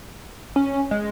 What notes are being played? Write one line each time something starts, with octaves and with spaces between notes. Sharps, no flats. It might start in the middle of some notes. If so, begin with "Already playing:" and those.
C#4
G#3